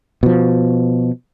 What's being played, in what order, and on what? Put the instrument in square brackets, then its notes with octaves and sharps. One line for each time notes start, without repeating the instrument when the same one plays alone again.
[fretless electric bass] B2 F3